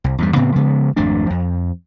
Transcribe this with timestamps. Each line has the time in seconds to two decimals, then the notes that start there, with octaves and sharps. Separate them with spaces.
0.04 C2
0.18 E2 G2 G3
0.36 A2 C#3 B3 C4
0.56 C#3 F3 G#3 B3
0.96 G#1 F2 A3 D4
1.30 F2